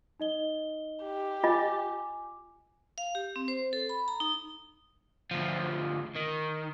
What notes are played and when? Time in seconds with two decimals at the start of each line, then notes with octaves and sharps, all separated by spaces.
0.20 D#4 D#5 G7
1.04 G4
1.44 F4 D#5 G#5 D6
2.98 F5
3.15 G4
3.36 C4
3.48 C5
3.73 A4
3.89 B5
4.08 A#5
4.20 D#4
5.31 D2 F3
6.16 D#3